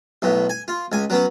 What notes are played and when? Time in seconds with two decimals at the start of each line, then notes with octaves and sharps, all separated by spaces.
0.22 B1 A2 B3
0.50 G#5
0.68 F4
0.92 C#2 G#5
1.10 F#3 B3 C#4